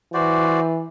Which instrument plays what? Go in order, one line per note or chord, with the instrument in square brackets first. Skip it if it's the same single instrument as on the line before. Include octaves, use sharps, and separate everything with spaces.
[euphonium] E3 [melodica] F#4 C5 D5